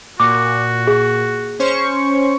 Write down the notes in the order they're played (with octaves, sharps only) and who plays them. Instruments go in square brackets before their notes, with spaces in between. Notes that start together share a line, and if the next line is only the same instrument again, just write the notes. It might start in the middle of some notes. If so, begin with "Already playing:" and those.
[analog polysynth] A#2 [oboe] F#4 [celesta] D6
[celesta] G#4
[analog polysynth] C#4 C5 C#6